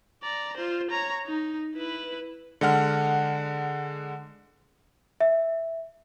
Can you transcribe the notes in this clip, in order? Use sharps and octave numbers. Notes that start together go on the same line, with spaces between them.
D5 A#5
F4 C5
C#5 A#5
D#4
E4 B4
D3 G#3 F#5 F6
E5